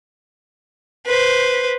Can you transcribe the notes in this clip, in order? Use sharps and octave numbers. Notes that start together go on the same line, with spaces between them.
B4 C5